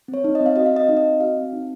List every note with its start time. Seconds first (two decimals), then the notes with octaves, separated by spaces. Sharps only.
0.08 C4
0.14 C#5
0.24 D#4
0.35 D#5
0.41 C4
0.46 F5
0.56 F#4 D#5
0.66 F5
0.72 C4 D#5
0.87 D#4 F5
0.97 D#5
1.04 C4
1.20 F#4 F5
1.37 C4
1.53 D#4